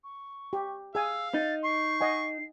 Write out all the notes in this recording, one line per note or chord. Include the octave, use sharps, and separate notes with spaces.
C#6
G4
G#4 F5 G#5 E6
D#4 A6
C#6 C7
D#5 F#5 G#5